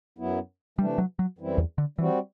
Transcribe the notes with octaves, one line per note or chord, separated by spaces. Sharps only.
F#2 F#3 B3 E4
C3 E3 G3 A3 D4
F#3
F#3
F#2 E3 G3 C4 E4
E2
D3
E3 G3 C4 F#4